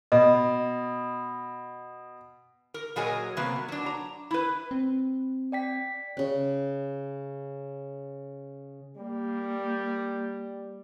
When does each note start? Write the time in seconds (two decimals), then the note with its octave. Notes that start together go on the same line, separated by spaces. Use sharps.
0.12 B2 D#5
2.74 A#4
2.96 A#2 F#3 G#4 A#4 D#5 G#5
3.37 C3 F#3 A#3 B3
3.68 F#3 D4
3.86 A#5
4.31 E4 B4
4.71 C4
5.52 D5 G5 B6
6.17 C#3 C#4
8.97 G3 A#3